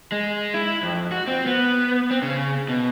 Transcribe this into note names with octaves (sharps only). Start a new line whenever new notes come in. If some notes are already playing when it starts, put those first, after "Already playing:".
G#3
E4
F2
F#4
C4
B3
C4
C#3
B2